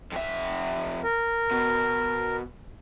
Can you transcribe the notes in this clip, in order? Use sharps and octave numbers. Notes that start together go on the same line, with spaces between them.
F2 E5
A#4
B2